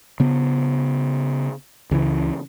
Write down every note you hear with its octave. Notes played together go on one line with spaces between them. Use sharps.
C#3 B3
C#2 C#3 E3